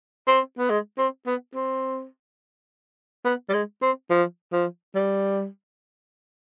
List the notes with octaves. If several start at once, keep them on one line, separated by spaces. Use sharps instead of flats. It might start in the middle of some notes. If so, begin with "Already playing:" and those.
C4
B3
G#3
C4
B3
C4
B3
G3
G#3
C4
F3
F3
G3